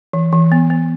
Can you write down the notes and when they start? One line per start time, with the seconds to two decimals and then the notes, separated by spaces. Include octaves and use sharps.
0.13 E3
0.33 E3
0.52 B3
0.70 B3